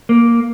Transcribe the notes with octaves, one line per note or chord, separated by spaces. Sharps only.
A#3